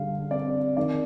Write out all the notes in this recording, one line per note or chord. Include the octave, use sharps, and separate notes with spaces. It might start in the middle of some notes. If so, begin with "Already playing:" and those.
Already playing: D3 G3 F5
C4 D5
D#3 D5